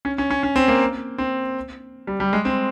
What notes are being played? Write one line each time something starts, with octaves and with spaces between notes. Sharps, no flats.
C#4
C#4
C#4
C#4
C4
A#3
C4
G3
G3
G#3
C4